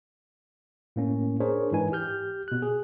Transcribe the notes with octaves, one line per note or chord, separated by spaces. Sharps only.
A2 A#3 C#4
D4 G#4 A#4 C5 C#5
G#2 E3 D#4 G#5
G4 F6 G6
B2 F#6
G#4